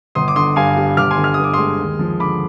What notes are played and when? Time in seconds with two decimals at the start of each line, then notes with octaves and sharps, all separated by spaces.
0.15 G1 C6 D#6
0.28 D6
0.36 D3 C6 D#6
0.56 G2 F5 G#5
0.77 G3
0.97 G1 D6 F6
1.11 G#5 C6
1.18 D3
1.24 F6
1.34 G2 D#6
1.44 D6
1.53 G#3 C6 D#6
1.79 D#2
1.99 F3
2.20 D3 B5 D6